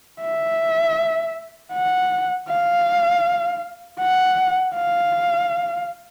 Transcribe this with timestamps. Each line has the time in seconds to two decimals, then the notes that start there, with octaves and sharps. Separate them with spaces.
0.21 E5
1.73 F#5
2.49 F5
4.00 F#5
4.75 F5